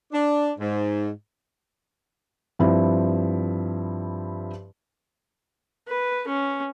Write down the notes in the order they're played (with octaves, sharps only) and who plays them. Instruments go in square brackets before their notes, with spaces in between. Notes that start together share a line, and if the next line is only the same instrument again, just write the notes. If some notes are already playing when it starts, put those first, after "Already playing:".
[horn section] D4
G#2
[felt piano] G2 F3 C4 E4
[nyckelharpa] B4
C#4